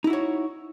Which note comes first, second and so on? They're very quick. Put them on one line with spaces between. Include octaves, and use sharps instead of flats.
D#4 E4 F#4 C#5